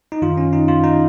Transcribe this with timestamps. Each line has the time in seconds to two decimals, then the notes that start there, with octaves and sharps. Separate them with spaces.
0.12 D#4
0.22 F#2 D#3 F4
0.37 C#4
0.53 D#4
0.68 F4
0.83 D#4